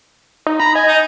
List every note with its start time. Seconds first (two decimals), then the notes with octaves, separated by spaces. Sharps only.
0.47 D#4
0.60 A#5 B5
0.75 D#5 G#5
0.88 D#4